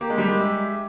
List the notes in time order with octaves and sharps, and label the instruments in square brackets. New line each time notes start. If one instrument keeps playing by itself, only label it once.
[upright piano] A#3 [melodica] G4
[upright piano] G#3
G3
G#3
[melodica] E5